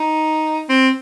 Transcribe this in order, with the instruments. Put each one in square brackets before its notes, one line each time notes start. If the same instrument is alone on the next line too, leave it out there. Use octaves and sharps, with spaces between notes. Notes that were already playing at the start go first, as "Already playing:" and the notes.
Already playing: [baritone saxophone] D#4
C4